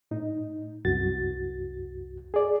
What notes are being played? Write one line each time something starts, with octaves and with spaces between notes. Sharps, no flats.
A2 D#4
C2 F#2 F#4 A6
G#4 D5